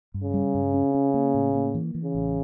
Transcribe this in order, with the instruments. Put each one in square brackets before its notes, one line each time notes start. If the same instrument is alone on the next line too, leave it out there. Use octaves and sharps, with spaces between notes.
[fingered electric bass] G2
[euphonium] C#3
[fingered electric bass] G3
G2
C#4
C#4
A#3
A2
A#3
E3
E3
[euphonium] C#3
[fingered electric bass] A1